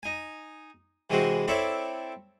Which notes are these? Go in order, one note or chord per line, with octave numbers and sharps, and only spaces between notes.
D#4 G#5
C3 E3 G#3 C4 F#4
C4 E4 A4 C#5 D5 E5